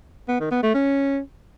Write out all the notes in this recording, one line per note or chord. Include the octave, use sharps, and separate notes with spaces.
B3
D#3
B3
A3
C#4